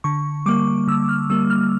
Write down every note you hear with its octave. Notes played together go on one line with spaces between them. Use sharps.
D3 C#6
G3 A#3 D6
D3 E6
F6
G3 A#3 E6
F6